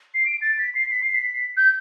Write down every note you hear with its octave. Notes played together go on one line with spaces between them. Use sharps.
C7
D7
A6
B6
C7
B6
C7
B6
G6